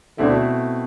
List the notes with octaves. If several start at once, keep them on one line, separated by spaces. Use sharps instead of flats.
D2 B2 D3 A3 C4 E4